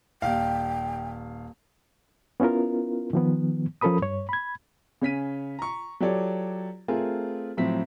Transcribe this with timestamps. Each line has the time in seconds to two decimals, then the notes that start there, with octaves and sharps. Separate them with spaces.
0.22 D#1 F5 G5
2.40 B3 C#4 E4 F4 A#4
3.13 D#3 F3 B3
3.81 F3 C#4 A4 A#4 B5 D#6
4.02 G2 C#5
4.29 B5 G#6
5.01 C#3 C#4 B6 D#7
5.59 A#5 C#6
6.00 F#3 F4 G4 A4 C#5 D5
6.88 A3 C4 F4 G#4 A#4
7.57 A2 F3 F#3 C4 B6